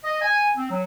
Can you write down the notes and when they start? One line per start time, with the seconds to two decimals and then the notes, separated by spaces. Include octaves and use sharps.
0.04 D#5
0.21 G#5
0.56 C4
0.71 F#3